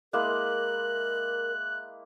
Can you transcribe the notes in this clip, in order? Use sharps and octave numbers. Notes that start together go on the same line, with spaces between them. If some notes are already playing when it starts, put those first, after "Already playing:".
G#3 A#3 E4 A#4 F#6